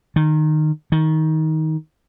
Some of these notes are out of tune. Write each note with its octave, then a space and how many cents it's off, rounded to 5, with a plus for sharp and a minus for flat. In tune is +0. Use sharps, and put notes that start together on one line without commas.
D#3 -15
D#3 +20